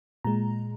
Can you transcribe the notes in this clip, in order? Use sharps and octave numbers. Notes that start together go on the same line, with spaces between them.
A#2 G#3 A#5